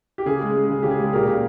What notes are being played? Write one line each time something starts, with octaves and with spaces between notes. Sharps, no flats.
G4
C#3 G#4
G#3
G#3
C#3
C#3 G4
G#4
G#3
A#2 G4 A#4
A#2